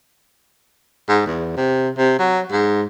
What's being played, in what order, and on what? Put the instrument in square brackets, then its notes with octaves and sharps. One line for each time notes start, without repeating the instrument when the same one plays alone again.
[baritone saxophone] G#2
E2
C3
C3
F#3
G#2